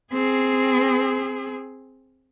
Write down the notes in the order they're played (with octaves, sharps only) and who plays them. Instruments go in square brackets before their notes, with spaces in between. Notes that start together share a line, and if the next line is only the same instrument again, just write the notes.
[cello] C4 G#4